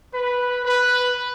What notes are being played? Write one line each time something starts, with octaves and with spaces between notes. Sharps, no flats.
B4
B4